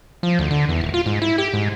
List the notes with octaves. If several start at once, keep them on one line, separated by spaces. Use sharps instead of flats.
F3
D2
D3
E2
D#1
F4
G#2
E4
G4
G#2